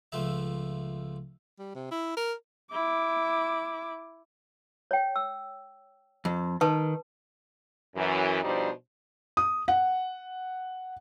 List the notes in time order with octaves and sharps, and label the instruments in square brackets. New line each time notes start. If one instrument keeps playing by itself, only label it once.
[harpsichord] C#2 F3 A3 E5
[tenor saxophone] G3
C3
E4
A#4
[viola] E4 D6
[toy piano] C#5 G5
E6
[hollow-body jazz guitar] F2
[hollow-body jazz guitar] D#3 [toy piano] B4 A5 D#6
[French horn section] F#2 E3
B2 F3 G3 D4 D#4 C5
[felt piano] D#6
F#5